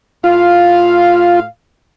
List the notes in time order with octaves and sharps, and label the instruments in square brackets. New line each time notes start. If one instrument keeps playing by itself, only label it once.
[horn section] A2 F5 [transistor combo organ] F4